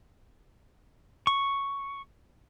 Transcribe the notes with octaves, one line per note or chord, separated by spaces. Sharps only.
C#6